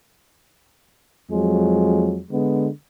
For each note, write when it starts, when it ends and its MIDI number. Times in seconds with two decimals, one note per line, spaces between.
1.32 2.21 41
1.32 2.21 54
1.32 2.21 56
2.31 2.69 50
2.31 2.69 56
2.31 2.69 59